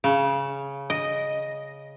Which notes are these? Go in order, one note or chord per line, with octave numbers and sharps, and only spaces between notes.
C#3
D#5